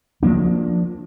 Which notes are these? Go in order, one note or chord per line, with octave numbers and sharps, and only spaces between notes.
F3 A#3 D4